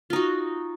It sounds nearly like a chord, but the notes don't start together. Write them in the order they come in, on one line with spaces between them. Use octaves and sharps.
F4 D#4 F#4